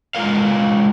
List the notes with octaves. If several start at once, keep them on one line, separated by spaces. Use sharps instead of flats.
G#3 F4 A#4 F5